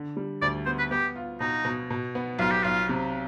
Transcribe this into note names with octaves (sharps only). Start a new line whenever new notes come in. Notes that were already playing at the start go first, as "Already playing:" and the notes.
Already playing: D3
G3
D2 D5
B3 C5
B4
B3 G4
F4
B2 D#4
B2
B2
B3
B1 F4
G4
B1 F4
C3